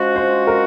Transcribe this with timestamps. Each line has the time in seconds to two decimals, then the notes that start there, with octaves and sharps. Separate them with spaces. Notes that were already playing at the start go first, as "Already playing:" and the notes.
Already playing: F3 G#3 C#4 F#4 C5
0.16 C5
0.47 A#4